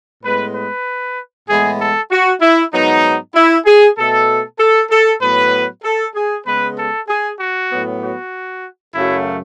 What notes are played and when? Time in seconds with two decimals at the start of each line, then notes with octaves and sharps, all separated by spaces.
0.23 A2 G#3 B3 B4
0.55 B4
1.48 A2 E3 G#3 B3 G#4
1.80 A4
2.11 F#4
2.41 E4
2.73 G#2 F#3 B3 D#4
3.35 E4
3.66 G#4
3.98 B2 A3 A4
4.59 A4
4.90 A4
5.22 A2 F#3 B3 B4
5.84 A4
6.15 G#4
6.46 C#3 G#3 B3 B4
6.77 A4
7.08 G#4
7.40 F#4
7.71 A2 F#3 B3
8.02 F#4
8.95 F#2 C#3 F#3 A3 E4